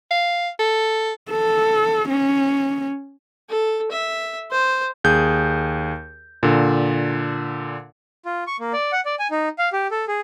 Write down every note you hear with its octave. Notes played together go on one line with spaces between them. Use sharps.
F5
A4
A4
C#4
A4
E5
C5
D#2 G#4 G6
A#2 D3
F4
C#6
A#3
D5
F#5
D5
G#5
D#4
F5
G4
A4
G#4